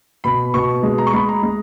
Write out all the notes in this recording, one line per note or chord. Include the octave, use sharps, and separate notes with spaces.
B2 B5
B2 C#6
G#3
A#5
C#6
G#3 B5
A#5
G#3